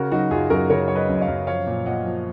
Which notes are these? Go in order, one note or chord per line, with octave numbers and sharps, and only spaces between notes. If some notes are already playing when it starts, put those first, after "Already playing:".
Already playing: C#3 F#4 A#4
F#3 D#4 F#4
F#2 F4 G#4
F#2 F#4 A#4
C#3 A#4 C#5
F#3 C#5
B4 D#5
F#2
D#5
C#5 F5
F#2
F3 C#5 F5
A#2
A#2 D#5 F#5
F3